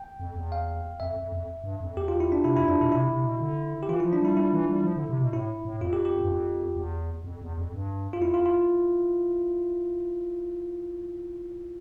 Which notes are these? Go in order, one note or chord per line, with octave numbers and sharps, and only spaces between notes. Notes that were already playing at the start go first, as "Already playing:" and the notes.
Already playing: G5
F2
E2
F5
F2 E5
F2
F2
G2
F2
E2 G4
F4
E4
D4
C3 E4
F2 E4
F2 D4
B2 E4
C3 E4
C3
B2
D3
G4
E3 F4
F3 E4
D4
G3 E4
G3 E4
E3
G3
F3
D3
C3
B2
A2 E4
A2
F2 F4
G4
G4
G2
F2
E2
F2
E2
F2
G2
F4
F2 E4
F4
F4